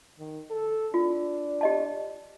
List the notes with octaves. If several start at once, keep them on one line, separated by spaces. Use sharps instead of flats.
D#3
A4
D4 F4
G4 D#5 A5